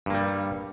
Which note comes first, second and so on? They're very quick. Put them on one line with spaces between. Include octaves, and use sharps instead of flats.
G2 A#3 G3